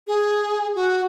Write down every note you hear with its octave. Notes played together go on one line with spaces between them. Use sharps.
G#4
F#4